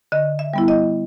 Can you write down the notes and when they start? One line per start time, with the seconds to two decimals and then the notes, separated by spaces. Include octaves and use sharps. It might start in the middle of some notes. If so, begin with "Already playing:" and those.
0.12 D3 D#5
0.39 E5
0.54 G3 B3 E4
0.68 D#5